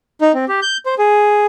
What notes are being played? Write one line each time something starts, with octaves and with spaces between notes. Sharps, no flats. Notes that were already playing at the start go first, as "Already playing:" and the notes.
D#4
C4
G4
G6
C5
G#4